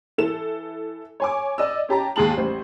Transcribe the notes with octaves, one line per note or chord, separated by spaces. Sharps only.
E3 A4 E7
C#5 G#5 D6
D5 D#5 E6
C#4 G4 A5 A#5
D#2 G#2 G#4 A5 F#7
A1 G3 C5